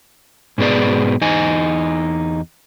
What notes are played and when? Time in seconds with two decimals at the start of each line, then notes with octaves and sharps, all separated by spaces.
0.58 G#2 B2 B3 G#4 D5
1.21 E2 D#4 G#5